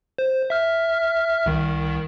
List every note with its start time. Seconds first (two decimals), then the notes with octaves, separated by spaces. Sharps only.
0.18 C5
0.50 E5 F6
1.46 C2 D#3